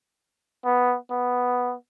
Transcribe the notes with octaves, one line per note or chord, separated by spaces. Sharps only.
B3
B3